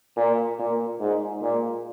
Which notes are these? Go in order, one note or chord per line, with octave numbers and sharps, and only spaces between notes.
A#2
A#2
G#2
A#2